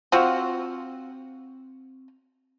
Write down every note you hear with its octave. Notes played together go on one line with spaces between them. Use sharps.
C4 F4 F#4